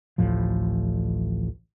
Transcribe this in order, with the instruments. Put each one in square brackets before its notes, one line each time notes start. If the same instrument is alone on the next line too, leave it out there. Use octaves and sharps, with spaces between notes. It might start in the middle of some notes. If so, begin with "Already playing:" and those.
[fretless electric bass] A1 D2 A2 F3